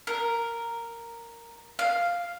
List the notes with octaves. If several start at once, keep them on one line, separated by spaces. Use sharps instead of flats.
A#4
F5